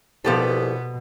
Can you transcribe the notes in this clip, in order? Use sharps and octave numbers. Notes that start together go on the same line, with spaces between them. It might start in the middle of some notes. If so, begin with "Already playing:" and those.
C2 B2 F3 B3 G4 A4